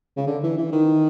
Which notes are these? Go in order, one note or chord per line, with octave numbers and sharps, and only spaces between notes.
C#3
D3
E3
E3
D#3